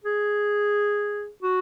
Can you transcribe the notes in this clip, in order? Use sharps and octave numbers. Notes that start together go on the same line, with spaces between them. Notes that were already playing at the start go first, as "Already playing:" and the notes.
G#4
F#4